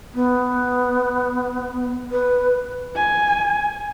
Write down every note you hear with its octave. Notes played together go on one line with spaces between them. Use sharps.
B3
B4
G#5